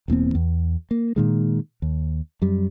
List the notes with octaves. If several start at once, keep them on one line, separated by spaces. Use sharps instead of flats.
E1 E2 A#3 C4
E2
A#3
A#2 D#3 G#3
D#2
F#2 G3